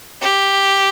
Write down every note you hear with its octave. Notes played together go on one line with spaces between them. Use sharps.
G4